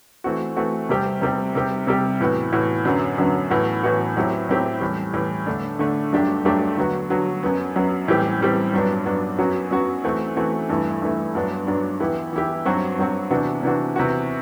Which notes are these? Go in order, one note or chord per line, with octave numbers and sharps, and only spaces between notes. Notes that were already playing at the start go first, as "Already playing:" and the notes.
E3 A3 C4 F#4
E3 A3 C4 F#4
C3 G3 C4 G4
C3 G3 C4 G4
C3 G3 C4 G4
C3 G3 C4 G4
A2 E3 B3 F#4
A2 E3 B3 F#4
F#2 D3 F#3 B3
F#2 D3 F#3 B3
A2 E3 B3 F#4
A2 E3 B3 F#4
A2 F#3 C4 E4 G4
A2 F#3 C4 E4 G4
A2 E3 G3
A2 E3 G3
D3 A3 D4
D3 A3 D4
G2 F#3 A3 D4 G4
G2 F#3 A3 D4 G4
D3 F#3 B3 F#4
D3 F#3 B3 F#4
F#2 F#3 B3
F#2 F#3 B3
A2 E3 G3 C4 G4
A2 E3 G3 C4 G4
G2 F#3 B3 D4
G2 F#3 B3 D4
F#2 F#3 B3 F#4
F#2 F#3 B3 F#4
E3 A3 C4 F#4
E3 A3 C4 F#4
G2 E3 A3 E4
G2 E3 A3 E4
G2 F#3 B3 D4
G2 F#3 B3 D4
E3 B3 E4 G4
E3 B3 E4 G4
G2 F#3 C4 F#4
G2 F#3 C4 F#4
C3 E3 B3 D4 F#4
C3 E3 B3 D4 F#4
C3 E3 B3 F#4